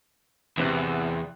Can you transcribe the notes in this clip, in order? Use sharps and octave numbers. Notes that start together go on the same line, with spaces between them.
A1 E2 C3 F#6